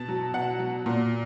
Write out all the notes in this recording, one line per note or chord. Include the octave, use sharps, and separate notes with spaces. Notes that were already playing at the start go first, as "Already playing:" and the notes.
Already playing: B2 A5
F#3
B2 F#5
F#3
A#2